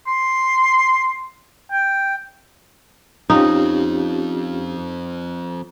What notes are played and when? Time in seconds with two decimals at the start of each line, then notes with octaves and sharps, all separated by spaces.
0.07 C6
1.72 G5
3.30 F3 C4 C#4 D#4 F4 G4